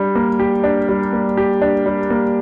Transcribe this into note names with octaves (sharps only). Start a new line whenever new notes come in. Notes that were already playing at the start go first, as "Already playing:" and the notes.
Already playing: G3 D4
A#3
G4
D4
G3
A#3
G4
D4
G3
A#3